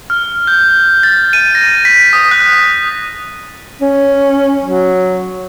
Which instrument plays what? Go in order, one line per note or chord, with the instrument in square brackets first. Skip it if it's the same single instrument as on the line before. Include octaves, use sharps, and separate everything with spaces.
[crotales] F6
G6
A6
D#7
A#6
B6
D#6
F#6
[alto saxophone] C#4
F#3